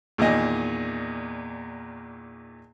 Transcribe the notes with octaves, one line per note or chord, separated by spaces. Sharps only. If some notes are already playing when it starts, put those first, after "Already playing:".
E2 A#2 D#3 D#5 G#5